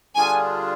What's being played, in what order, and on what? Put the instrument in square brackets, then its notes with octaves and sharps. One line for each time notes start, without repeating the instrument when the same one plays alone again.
[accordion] D3 G3 D4 F4 G#4 [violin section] G#5